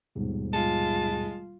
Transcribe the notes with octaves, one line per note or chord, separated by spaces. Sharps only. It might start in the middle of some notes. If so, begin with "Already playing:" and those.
D#1 G#2 B2
G#3 F4 A5